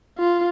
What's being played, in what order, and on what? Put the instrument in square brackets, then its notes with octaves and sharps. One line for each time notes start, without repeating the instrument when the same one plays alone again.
[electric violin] F4